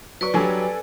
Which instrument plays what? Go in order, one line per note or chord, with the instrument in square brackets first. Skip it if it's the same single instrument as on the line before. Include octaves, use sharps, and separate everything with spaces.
[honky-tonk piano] F#3 C#6 [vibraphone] B4 D5
[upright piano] F#3 G3 [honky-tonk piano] D4 A4 G#5